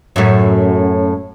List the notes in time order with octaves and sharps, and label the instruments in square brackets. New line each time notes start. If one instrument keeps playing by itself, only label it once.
[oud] F#2 A2